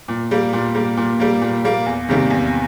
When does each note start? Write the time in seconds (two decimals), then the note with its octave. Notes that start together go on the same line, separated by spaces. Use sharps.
0.08 A#2
0.31 G3 A#3
0.53 A#2
0.75 G3 A#3
0.97 A#2
1.20 G3 A#3
1.41 A#2
1.64 G3 A#3
1.86 E2
2.09 C3 D#3 G3 A#3
2.30 E2